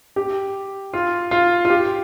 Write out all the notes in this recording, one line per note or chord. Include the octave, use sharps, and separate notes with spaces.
G4
F4
F4
F4
G4